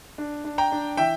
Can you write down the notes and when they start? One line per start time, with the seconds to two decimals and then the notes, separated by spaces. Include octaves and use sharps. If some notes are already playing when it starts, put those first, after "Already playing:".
0.18 D4
0.45 D4
0.58 G5 A#5
0.72 D4
0.97 E3 E5 G5